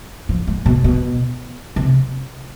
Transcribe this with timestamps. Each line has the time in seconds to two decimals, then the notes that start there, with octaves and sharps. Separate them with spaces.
0.29 F3
0.47 G#3
0.66 B2
0.84 B2
1.76 C3